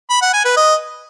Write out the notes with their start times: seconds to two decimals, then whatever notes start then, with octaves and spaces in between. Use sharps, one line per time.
0.10 B5
0.22 F#5
0.33 G#5
0.45 B4
0.57 D#5